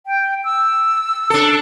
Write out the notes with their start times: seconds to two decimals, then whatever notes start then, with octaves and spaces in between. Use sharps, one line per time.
0.07 G5
0.44 E6
1.30 D4 A4